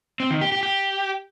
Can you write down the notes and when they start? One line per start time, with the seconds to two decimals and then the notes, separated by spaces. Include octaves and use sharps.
0.20 C4
0.31 D#3
0.41 G4
0.52 G4
0.63 G4